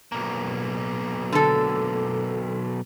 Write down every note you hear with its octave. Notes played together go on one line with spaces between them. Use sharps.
B1 A#3
D3 A4